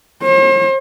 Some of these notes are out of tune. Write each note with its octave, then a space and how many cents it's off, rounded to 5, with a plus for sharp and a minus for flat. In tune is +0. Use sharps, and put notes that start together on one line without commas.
C5 +45